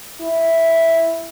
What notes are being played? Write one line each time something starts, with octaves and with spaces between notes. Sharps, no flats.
E4